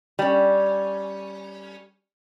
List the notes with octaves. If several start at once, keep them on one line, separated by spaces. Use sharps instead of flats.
G3 C#4